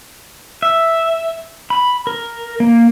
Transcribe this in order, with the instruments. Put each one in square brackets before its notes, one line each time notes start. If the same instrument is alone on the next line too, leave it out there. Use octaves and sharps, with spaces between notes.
[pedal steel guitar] E5
B5
A#4
A#3